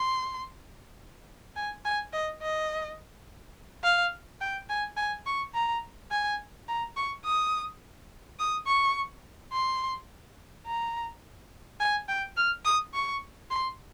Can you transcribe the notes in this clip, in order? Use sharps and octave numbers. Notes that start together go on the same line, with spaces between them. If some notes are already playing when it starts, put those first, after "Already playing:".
Already playing: C6
G#5
G#5
D#5
D#5
F5
G5
G#5
G#5
C#6
A#5
G#5
A#5
C#6
D#6
D#6
C#6
C6
A#5
G#5
G5
F6
D#6
C#6
C6